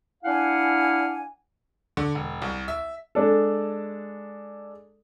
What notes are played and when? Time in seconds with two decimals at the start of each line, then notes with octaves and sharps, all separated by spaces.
0.24 D4 E4 F5 F#5 G#5
1.97 D3
2.15 E1
2.42 C2
2.68 E5
3.15 G#3 D4 A4